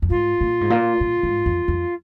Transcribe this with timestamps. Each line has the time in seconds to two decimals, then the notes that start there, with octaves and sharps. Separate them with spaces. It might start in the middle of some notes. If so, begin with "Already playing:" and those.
0.02 F2
0.09 G#2 F4
0.41 A#2
0.61 G#2
0.70 A#2
1.01 A#2
1.23 G#2
1.46 F2
1.68 F2